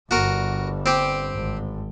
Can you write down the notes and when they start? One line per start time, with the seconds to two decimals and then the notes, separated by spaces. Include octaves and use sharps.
0.11 G1 G2 F#4 A#4
0.86 C4 G4
1.33 G#1